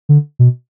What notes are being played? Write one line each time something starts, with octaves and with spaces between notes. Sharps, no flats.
D3
B2